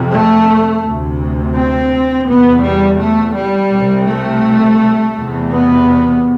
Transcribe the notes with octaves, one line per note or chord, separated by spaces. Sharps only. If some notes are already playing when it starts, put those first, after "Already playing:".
Already playing: F2 C3
A3
D2 C3
C4
E2 C3 B3
G3
A3
G3
C2
C3
A3
E2 C3
B3